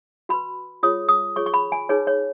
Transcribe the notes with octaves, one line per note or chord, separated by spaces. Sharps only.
F#4 B4 B5
F4 G#4 C#5 D#6
D#6
F4 G#4 C#5 C#6
C#6
B5
G#5
D#4 G#4 B4 C#5
C#5